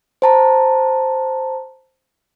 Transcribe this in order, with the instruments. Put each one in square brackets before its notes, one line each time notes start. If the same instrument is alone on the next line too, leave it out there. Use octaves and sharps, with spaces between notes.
[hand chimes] C5 A5 A#5